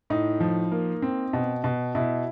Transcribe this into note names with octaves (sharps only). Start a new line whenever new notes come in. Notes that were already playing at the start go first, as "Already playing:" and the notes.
A2 D#4
F3
A#3
C4
B2
B2
B2 E4